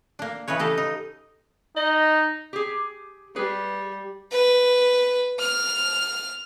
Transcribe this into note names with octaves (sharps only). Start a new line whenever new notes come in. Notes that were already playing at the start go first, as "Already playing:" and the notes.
A#3 D4
C#3 E3 D#4 B4 C#5
G4 A4 D#5 F5
D#4
D#4 D#5
G4 G#4
G3 G#4 B4
B4
F6